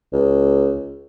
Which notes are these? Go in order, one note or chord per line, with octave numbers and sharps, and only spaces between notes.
C#2